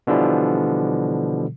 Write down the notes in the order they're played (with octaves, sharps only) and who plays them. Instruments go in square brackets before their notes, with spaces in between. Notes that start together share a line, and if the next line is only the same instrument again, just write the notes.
[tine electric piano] B2 D3 E3 F3 G3